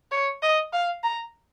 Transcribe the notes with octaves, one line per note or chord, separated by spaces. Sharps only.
C#5
D#5
F5
A#5